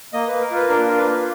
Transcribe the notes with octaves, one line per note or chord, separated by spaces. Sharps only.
A#3 D#5
A#3 B4
A#4
F4
B4
D4 A#4
F4
B4
A#3